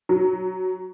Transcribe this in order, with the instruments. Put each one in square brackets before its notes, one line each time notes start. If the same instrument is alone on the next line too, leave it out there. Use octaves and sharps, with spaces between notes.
[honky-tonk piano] F#3